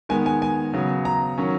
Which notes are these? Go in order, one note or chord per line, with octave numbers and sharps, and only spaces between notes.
D#3 G#3 B3 G#5
G#5
G#5
C#3 F#3 B3
A#5
D#3 F#3 C#4